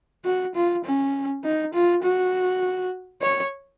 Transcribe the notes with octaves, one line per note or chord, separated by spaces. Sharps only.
F#4
F4
C#4
D#4
F4
F#4
C#5